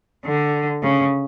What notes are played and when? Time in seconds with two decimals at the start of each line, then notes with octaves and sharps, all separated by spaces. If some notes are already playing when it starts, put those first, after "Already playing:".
0.25 D3
0.83 C#3